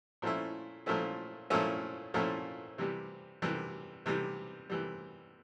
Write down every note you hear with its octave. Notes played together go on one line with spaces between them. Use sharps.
A#2 F3 A3 C#4 E4
A#2 F3 A3 C#4 E4
A#2 F3 A3 C#4 E4
A#2 F3 A3 C#4 E4
C3 E3 G3
C3 E3 G3
C3 E3 G3
C3 E3 G3